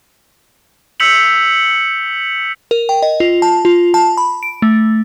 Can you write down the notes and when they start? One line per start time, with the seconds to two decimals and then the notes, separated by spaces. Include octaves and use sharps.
1.00 E6 G6 B6 C#7 F7 F#7
2.71 A#4
2.89 G5
3.02 D#5
3.20 F4
3.42 A5
3.65 F4
3.94 A5
4.17 B5
4.43 D7
4.62 A3